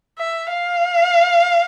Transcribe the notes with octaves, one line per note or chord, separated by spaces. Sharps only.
E5
F5